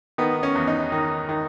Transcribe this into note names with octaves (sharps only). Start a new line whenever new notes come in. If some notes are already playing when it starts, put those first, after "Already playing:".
D#3 B3
C#4
E2
D#4
D#3
D#3